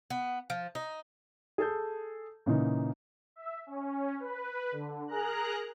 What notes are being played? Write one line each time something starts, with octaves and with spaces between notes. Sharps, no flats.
B3
F3
D#4
G#4 A4 A5 G6
A#2 C#3 E3 D#4
E5
C#4
B4
D3
G#4 A#4 A#5 F#6